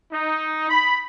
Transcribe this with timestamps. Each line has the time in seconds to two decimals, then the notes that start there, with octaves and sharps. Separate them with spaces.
0.11 D#4
0.69 B5